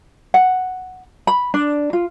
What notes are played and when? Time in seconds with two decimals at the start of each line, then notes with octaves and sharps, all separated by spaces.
0.34 F#5
1.27 B5
1.54 D4
1.93 F4